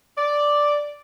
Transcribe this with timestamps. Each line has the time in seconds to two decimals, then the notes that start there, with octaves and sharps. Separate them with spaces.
0.18 D5